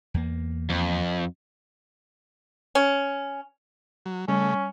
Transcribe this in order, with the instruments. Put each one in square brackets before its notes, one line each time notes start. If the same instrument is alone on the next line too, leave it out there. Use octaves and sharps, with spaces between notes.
[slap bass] E2 A#3
[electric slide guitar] F2
[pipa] C#4
[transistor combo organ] F#3
[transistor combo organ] C#3 A3 [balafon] G3 [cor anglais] C#4